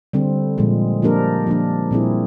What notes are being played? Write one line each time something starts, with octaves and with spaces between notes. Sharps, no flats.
D3 G3 C4
A#2 F3 G#3
F3 A#3 D4 G4 A#4
F3 A#3 D4
A#2 G3 C4 E4 G#4